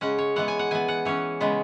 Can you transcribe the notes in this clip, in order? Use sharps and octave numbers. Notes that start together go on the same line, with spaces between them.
C#3 G#3 C#4 F#5
C#5
E3 G#3 B3 F#5
G#5
F#5
E3 B3 G#5
F#5
E3 C#4 C#5
C#3 G#3 B3